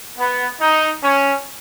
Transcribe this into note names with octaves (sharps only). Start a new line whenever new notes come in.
B3
D#4
C#4